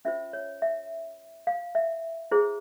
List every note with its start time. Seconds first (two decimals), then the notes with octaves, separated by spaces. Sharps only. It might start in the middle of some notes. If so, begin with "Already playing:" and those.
0.05 C#4 F4 C5 E5
0.33 C#5
0.62 E5
1.47 F5
1.75 E5
2.31 E4 G#4 C5